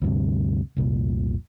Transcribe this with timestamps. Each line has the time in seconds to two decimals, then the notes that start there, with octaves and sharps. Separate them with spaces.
0.02 D2 G2 C3
0.77 F1 C2 A#2